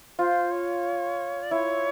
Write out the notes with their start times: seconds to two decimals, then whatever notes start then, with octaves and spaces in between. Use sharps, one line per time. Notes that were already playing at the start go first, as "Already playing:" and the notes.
0.19 F4 C5
0.52 C#5
1.42 D5
1.51 E4 C#5